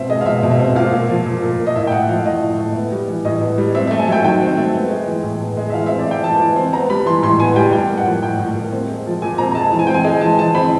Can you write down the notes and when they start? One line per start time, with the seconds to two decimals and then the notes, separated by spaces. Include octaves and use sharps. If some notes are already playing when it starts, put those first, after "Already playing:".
Already playing: B2 C4 E5
0.09 G#3 D#5
0.21 F5
0.26 B2 E5
0.43 B2
0.51 E5
0.60 C4
0.75 A#2 F5
0.93 A#3
1.09 F3
1.26 A#2
1.42 A#2
1.59 A#3
1.67 D#5
1.76 A2 E5
1.87 G5
1.92 A3 F#5
2.09 F3 F5
2.25 A2 D#5
2.42 A2
2.58 A3
2.75 B3
2.92 G3
3.08 E3
3.25 A2 D#5
3.41 B3
3.58 G3
3.75 C4 E5
3.87 A3 E5
3.99 G#5
4.08 F#3 G5
4.24 D#3 G5
4.41 C4
4.57 A3
4.74 B3
4.90 G#3
5.08 E3
5.24 A2
5.41 B3
5.57 G#3
5.70 E5
5.74 E3 F5
5.86 C4 E5
5.99 D5
6.06 A3 G5
6.24 E3 A5
6.40 E3
6.56 C4
6.73 B3 A#5
6.90 G3 B5
7.06 E3 C6
7.23 A2 C6
7.40 B3 G#5
7.56 G3 G5
7.72 A2 G5
7.90 A#3
7.98 F#5
8.06 F3
8.23 A2 G5
8.39 A2
8.56 A#3
8.72 C4
8.89 G#3
9.06 F3
9.22 A#2 G#5
9.38 C4 A#5
9.51 A#5
9.55 G#3 A5
9.72 E3 A5
9.79 G#5
9.87 C4 G5
9.94 G#5
10.04 G#3
10.21 E3 A5
10.38 E3 A5
10.55 C4 B5